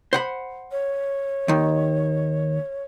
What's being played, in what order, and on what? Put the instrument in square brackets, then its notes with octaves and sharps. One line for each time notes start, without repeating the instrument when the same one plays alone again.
[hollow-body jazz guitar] C5 F#5 B5
[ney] C#5
[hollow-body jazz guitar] D#2 D#3